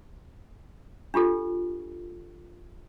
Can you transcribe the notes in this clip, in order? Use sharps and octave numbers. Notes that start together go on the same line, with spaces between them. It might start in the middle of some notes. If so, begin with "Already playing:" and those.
D4 F4 G4 A4